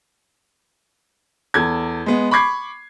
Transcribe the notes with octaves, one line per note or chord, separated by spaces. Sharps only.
E2 A4 G#6
G#3 B3
B5 C#6 D6 G#6 C7